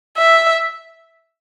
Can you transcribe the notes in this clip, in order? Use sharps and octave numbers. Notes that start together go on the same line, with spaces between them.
E5